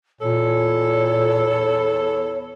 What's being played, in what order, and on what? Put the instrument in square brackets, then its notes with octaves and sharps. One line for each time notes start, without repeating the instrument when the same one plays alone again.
[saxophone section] E2 A4 [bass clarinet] A#2 [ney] C#5